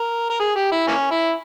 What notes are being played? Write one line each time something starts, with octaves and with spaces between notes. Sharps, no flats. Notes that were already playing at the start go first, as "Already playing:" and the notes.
Already playing: A#4
A#4
G#4
G4
E4
E3 A#3 C#4
E4